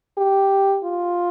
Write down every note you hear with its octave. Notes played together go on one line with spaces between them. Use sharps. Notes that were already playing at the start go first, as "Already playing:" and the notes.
G4
F4